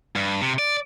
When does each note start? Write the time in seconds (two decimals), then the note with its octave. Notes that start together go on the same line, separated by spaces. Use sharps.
0.16 G2
0.42 C3
0.59 D5